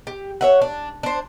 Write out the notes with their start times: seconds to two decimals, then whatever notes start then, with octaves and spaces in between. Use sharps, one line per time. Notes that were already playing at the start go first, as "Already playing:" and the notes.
0.07 G4
0.41 C#5 E5 F#5
0.61 D4
1.03 D4 C5